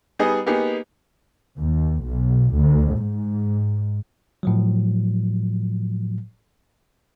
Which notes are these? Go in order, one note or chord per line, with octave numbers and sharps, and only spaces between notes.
G3 B3 D#4 G#4 D#5
A#3 B3 D#4 G4 G#4
D#2
B1
D2
G#2
A2 F3 F#3